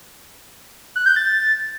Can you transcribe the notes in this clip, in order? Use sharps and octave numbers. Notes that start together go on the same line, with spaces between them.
F#6
G6
A6